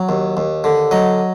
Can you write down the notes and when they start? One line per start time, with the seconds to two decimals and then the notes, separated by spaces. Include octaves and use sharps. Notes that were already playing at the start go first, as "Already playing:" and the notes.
Already playing: F#3
0.09 D#2
0.37 D#2
0.64 D3
0.91 F#3 D#5